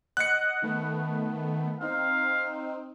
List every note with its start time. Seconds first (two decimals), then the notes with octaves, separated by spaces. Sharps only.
0.17 D#5 F#5 F#6 C#7
0.62 D#3 A3 B3
1.81 C4 D#4 F5